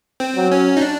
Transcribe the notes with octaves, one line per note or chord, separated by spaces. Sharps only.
C4
F#3
C#4
D#4
D4